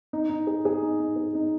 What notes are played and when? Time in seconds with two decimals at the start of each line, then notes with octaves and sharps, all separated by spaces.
0.13 D#4
0.29 D#4
0.47 G#4
0.65 G#4
0.82 D#4
1.00 D#4
1.16 G#4
1.35 D#4